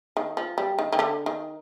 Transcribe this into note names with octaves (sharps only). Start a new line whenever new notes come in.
D#3
F3
G3
D#3
D#3
D3
D#3